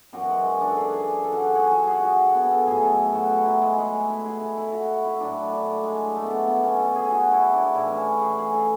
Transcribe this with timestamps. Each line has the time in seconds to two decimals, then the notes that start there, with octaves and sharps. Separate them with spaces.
0.13 F#2 E3 F#4
0.29 G#3
0.45 G#3
0.61 D4
0.69 A4
0.77 G#4
0.93 G#4
1.24 A4
1.32 F#4
1.40 G#4
1.55 G#4
1.71 F#4
1.87 G#4
2.03 F#4
2.34 B3
2.51 A4
2.67 A2 F#3 G#4
2.83 A4
3.14 F#4
3.31 E4
3.46 F#3
3.62 G#3
3.78 G#3
3.93 A3
4.10 E4
4.25 G#4
4.41 A4
4.57 E4
4.73 F#4
5.05 E4
5.20 A2 F#3 D4
5.53 D4
5.83 G#3
6.16 A3
6.23 B3
6.30 A3
6.48 B3
6.63 C#4
6.79 A4
6.95 G#4
7.11 F#4
7.32 E4
7.53 D4
7.75 A2 E3 E4
7.90 C#4
8.21 G#4
8.38 G#4
8.53 A4